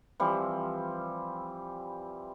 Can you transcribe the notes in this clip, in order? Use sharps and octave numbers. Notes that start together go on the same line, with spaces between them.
E3 F3 G3 C4